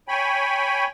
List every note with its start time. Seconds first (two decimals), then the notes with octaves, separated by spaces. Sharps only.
0.08 C#5 G5 G#5 B5